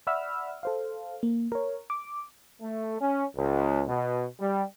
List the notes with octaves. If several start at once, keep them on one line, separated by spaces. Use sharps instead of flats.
D5 E5 F#5 B5 E6 F6
A4 C5 F5
A#3
A#4 C#5
D6
A3
C#4
C#2
B2
G3